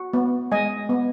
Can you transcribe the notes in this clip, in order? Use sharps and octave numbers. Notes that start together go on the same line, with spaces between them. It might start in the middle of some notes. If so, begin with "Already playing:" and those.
Already playing: F#4
B3
G#3 D#5 G#5
B3